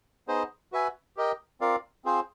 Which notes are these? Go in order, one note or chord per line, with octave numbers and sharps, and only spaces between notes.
B3 D#4 G#4 C5 D#5
F#4 B4 E5 G#5
G4 A#4 D#5 G5
C4 F4 A#4 D5 F5
C4 F4 G#4 C5